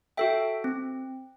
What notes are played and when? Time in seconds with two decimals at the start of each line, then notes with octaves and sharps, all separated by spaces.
0.17 F#4 A4 E5 G5
0.64 C4